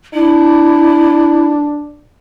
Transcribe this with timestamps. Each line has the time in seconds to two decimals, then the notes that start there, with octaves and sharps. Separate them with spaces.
0.14 D4 E4